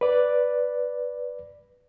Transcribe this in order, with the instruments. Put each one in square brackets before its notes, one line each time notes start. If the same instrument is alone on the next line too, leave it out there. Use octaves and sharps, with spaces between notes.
[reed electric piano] B4 D5